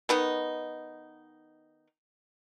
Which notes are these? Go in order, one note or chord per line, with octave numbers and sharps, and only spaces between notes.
D#3 B3 D#4